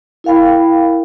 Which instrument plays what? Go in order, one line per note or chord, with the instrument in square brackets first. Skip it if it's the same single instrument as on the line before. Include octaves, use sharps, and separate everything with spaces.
[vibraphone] E4 A#4 F5 G5 B5